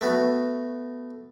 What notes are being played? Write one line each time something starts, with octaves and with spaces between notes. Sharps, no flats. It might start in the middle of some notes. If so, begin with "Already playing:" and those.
A3 B3 F#4